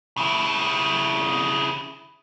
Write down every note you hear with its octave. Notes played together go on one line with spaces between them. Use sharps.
C#3 E4